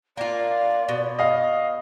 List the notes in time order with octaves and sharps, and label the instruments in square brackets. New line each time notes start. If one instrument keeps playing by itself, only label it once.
[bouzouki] A#3 F4 [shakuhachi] D5
[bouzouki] B2
[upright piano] D#5 F5